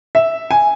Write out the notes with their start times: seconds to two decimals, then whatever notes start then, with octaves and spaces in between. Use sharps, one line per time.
0.15 E5
0.51 G#5